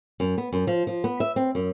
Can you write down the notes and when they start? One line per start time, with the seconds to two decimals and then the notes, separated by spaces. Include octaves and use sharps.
0.20 F#2
0.38 B3
0.53 F#2
0.67 F3
0.87 F3
1.04 B3
1.20 E5
1.36 C4
1.55 F#2